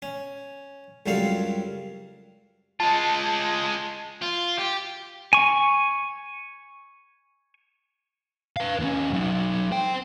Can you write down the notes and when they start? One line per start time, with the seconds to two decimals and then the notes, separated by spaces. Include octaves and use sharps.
0.02 C#4
1.06 C#2 F#2 G3 C4 A4 F5
2.80 G#3 F4 A5
4.22 F4
4.58 G4
5.33 G#5 C#6
8.57 B4 F5
8.79 D#2 C#4
9.13 F#3 D#4
9.72 C5 G5